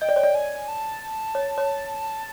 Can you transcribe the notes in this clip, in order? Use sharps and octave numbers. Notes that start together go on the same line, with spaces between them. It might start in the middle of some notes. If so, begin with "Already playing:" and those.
D#5 G5
D5
C#5
D5
G#5
A5
C#5
C#5